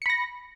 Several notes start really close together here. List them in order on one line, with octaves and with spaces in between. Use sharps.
C#7 B5 A#6